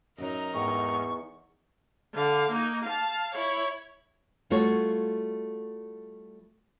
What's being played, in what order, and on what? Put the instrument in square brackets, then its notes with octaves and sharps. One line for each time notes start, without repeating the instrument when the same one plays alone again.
[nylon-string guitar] F#2 F#3 [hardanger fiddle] D#4 A#4
[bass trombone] E2 [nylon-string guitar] G#2 G5 [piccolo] C#6
[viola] D3 F5
A#3 D#4
F5 A5
E4 C#5
[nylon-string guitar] G3 A3 F4 F#4 C#5